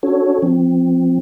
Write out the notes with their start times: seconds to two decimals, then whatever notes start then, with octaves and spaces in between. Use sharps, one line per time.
0.03 C#4 D4 F#4 A4 C#5
0.42 F3 C4